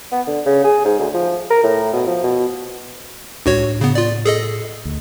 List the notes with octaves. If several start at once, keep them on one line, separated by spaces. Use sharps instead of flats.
B3
D3
C#3
G#4
G#2
D2
F3
A#4
A2
B2
F3
B2
C#2 A2 D4 F#4 C#5
C#3 B3
F4 D5
G#4 A4 D#5
D2